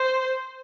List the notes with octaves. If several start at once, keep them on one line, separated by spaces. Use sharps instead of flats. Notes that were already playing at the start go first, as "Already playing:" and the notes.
Already playing: C5